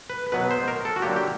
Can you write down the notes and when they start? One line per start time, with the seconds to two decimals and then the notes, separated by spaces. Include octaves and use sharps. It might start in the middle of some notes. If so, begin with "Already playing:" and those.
0.10 B4
0.32 B2 F#3 B3 B4
0.51 C5
0.68 A#4
0.85 A4
0.96 F#4
1.02 D3 F#3 A#3 G4
1.16 G4